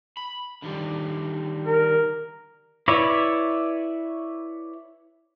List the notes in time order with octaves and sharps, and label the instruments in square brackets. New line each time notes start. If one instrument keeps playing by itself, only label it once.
[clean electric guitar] B5
D3 D#3 G3
[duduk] A#4
[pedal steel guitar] E4 B4 C#5 D5 E5